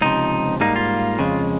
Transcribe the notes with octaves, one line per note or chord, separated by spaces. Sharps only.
C#2 C3 F3 D#4
G#2 G3 A#3 D#4
F4
F2 C#3 G#3